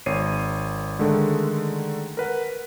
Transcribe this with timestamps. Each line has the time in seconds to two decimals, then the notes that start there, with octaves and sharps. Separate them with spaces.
0.06 G#1 C#5 C7 D#7
0.99 D3 D#3 G#3 A3
2.17 A#4 B4 F#5